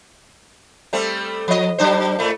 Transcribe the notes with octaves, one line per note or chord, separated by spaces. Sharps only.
G3 A3 C4
F3 D#5
F#3 D4 C5
A2 A3